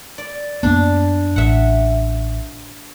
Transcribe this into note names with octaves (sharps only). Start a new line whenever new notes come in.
D5
F#2 A#3 B3 D4
A1 E5 F#5